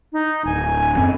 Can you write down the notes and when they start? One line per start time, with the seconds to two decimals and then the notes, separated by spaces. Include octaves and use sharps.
0.13 D#4
0.45 D1 G#5
0.97 F#2 C4